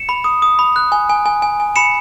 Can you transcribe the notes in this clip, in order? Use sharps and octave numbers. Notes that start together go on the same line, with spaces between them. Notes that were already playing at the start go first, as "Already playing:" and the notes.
Already playing: C#7 E7
B5
D#6
D#6
B5
F#6
G#5
G#5
G#5
G#5
G#5
B5 C#7 E7